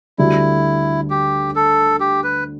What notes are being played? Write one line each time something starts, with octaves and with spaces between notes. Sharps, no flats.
D2 D3 G3 D4 E4
G4
A4
G4
B4